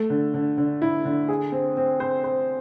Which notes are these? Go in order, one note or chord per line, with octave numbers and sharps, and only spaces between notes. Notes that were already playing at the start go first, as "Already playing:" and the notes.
Already playing: A3
D3
D3
D3
E4
D3
G#4
C4
C4
C5
C5